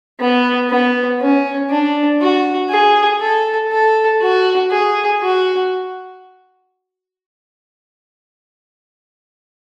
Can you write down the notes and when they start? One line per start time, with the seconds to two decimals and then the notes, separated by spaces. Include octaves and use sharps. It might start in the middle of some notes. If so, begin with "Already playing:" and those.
0.20 B3
0.69 B3
1.20 C#4
1.69 D4
2.21 F#4
2.70 G#4
3.20 A4
3.71 A4
4.21 F#4
4.71 G#4
5.22 F#4